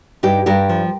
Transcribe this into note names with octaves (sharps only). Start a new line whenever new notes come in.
G2 D#4 G4
G2 G4 A#4
F3